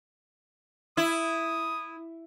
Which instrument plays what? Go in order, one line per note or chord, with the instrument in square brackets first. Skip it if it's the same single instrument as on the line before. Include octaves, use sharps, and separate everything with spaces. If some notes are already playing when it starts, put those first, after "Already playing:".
[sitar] E4 [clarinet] D#6